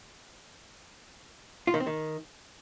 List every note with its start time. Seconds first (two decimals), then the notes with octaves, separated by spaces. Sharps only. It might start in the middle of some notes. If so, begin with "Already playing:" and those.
1.67 F4
1.74 D#3
1.80 C4
1.87 D#3